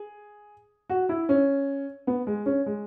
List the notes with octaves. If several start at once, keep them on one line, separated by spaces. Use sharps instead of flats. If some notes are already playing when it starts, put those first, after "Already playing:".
Already playing: G#4
F#4
E4
C#4
B3
G#3
C#4
G#3